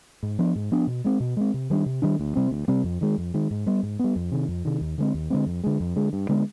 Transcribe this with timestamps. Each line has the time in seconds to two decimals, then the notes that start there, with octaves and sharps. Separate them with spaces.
0.23 G#2
0.39 F3 B3 D4
0.55 G#2
0.71 F3 B3 D4
0.87 B2
1.04 G#3 C4
1.20 B2
1.37 G#3 C4
1.54 C3
1.70 D#3 G3 D4
1.86 C3
2.02 D#3 G3 D4
2.19 D2
2.36 C3 G3 C4
2.51 D2
2.68 C3 G3 C4
2.84 F2
3.01 D#3 G#3
3.18 F2
3.34 D#3 G#3
3.51 G#2
3.66 G3 B3
3.83 G#2
3.99 G3 B3
4.16 F2
4.32 C3 D#3
4.48 F2
4.65 C3 D#3
4.81 D#2
4.98 D3 G#3 C4
5.14 D#2
5.30 D3 G#3 C4
5.47 F2
5.64 D3 G#3
5.80 F2
5.96 D3 G#3
6.13 G2
6.29 D3 G#3 B3